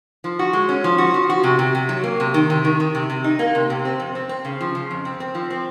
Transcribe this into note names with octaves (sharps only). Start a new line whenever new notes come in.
F3
F#4
G#3
C#4
F3
F#4
F3
F#4
C3
C3
C3
F#3
A#3
C3
D#3
C3
D#3
D#3
C3
C3
D#4
A#3
C3
C3
C4
F2
C4
C4
C#3
F3
C#3
F2
C4
C4
F3
C4